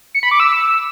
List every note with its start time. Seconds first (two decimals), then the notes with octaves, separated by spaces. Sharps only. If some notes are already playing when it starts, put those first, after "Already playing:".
0.15 C#7
0.23 B5
0.31 D6
0.40 E6